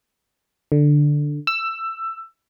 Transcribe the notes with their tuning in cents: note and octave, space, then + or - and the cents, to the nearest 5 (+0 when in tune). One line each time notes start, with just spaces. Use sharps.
D3 +5
E6 +15